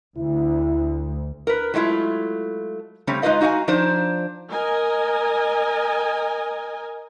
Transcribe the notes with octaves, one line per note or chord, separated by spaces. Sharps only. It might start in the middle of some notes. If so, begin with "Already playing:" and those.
D2 E4
A#4 B4
F#3 G#3 A3 E4 F4
C#3 G3 A3 C4 C#4
G#3 D#4 F4 B4 D#5 F5
D#4 F#4 F5 F#5 G#5
F3 D4 D#4 C5
A#4 D#5 G#5